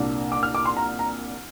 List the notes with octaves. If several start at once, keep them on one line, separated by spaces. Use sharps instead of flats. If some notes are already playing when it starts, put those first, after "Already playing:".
Already playing: C2 A#2 A#3 D4
D6
F6
D6
C6
A#5
A#5